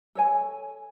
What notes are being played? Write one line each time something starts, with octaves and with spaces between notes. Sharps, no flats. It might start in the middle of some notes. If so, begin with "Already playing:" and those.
A4 C#5 G#5